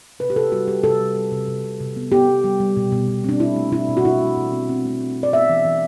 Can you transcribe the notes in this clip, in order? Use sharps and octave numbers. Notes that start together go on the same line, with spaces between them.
C3 B4
G4
C3 A4
G3 F#4
G3 G4
C3 A4
G3
G3
C3
C3
C3
C3
B3
B3 G4
B3
G3
G3
B2
B2
B2
C4 D4
B2 E4
A3
B2 E4
B2
F#4
B2 E4
A3
B2
C4
C4
A3
C4
C4
D5
B3 E5
E3
E3